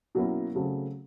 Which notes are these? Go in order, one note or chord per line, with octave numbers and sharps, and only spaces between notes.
B2 F#3 A#3 C#4 E4
C#3 F#3 A3 C4